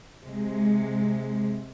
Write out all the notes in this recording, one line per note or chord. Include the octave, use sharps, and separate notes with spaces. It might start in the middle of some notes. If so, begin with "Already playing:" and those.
C3 G#3